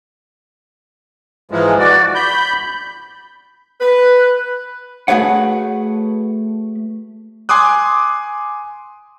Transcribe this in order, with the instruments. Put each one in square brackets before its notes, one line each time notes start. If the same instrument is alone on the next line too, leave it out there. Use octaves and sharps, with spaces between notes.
[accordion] G#2 E3 F3 G#3
F#4 D5
B5 G6
[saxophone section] B4
[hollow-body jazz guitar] A3 F#4 G#4 B4 C#5 F#5
[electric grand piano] G#5 C6 D6 D#6 F#6